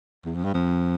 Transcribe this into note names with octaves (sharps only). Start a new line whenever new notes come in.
E2
F2
G2
F2